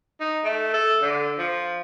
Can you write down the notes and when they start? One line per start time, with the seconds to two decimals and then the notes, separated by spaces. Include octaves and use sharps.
0.20 D#4
0.44 A3
0.74 A4
1.02 D3
1.38 F3